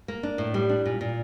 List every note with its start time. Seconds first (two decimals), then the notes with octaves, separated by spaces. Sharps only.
0.08 A#3
0.23 D4
0.38 A2
0.54 G3
0.69 D4
0.86 A#2
1.01 A#2